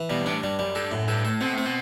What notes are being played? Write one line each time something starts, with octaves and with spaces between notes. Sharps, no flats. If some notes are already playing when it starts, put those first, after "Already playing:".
Already playing: E3
B2 G3
G2
A2 D4
G2 G3
F#2 G3
G2 A4
F#2 A2
G2 A4
A2 A4
B2 C4
A2
C4
B2